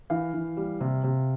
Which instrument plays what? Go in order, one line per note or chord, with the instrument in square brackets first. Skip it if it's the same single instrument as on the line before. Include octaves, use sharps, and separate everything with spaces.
[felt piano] E3 F5
E3
G3
C3
C3